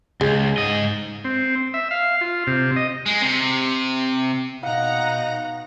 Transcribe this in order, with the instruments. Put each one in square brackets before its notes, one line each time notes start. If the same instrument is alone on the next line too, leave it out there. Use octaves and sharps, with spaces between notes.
[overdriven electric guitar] C#2 [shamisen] G#3
[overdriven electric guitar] G#2 D#5
[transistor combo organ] C4
E5
F5
F4
C3
D#5
[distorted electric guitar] G#3
C3
[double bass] B2 [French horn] D#4 [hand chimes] F5 [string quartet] F#5 A#5 A#6